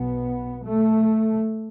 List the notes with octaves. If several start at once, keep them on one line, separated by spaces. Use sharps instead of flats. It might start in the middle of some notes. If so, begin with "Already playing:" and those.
Already playing: B1 B2 B3
A3